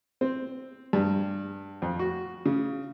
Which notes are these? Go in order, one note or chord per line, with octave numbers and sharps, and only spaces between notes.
C4
G2
F2
F#4
C#3